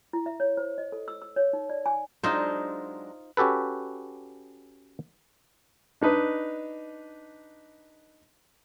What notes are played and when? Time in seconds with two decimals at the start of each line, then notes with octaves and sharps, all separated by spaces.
0.13 E4
0.26 E5
0.40 C#5
0.57 C5
0.78 D#5
0.92 A4
1.08 E6
1.22 E6
1.36 C#5
1.53 D#4
1.70 D5
1.86 G#5
2.23 F#3 G#3 D4 D#4 F4 C5
3.37 C#4 F#4 G4 A4 B4
6.01 D4 D#4 B4 D#5